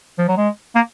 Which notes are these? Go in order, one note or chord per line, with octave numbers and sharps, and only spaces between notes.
F3
F#3
G#3
A#3